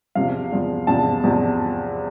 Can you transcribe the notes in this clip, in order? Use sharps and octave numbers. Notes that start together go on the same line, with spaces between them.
E2 C3 F3 F5
E2 C3 F3
E2 C3 F3 A5
E2 C3 F3